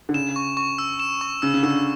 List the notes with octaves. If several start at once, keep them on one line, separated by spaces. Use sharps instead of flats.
D3
C#3 E7
C#6
C#6
E6
E7
C#6
C#3 E6
C#3
D3 E6